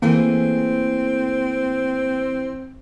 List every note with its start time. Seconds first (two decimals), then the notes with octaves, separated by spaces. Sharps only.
0.02 E3 A3 A#3 C4 G#4